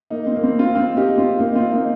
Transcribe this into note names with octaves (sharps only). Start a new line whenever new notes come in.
A#3 D#4
C4
A#3
C4
C4 F4
C4 F4
D#4 G4
C4 F4
A#3 D#4
C4 F4
A#3 D#4